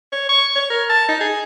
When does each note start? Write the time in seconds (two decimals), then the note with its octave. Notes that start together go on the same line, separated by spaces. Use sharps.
0.12 C#5
0.29 C#6
0.55 C#5
0.70 A#4
0.90 A5
1.08 D#4
1.20 G#4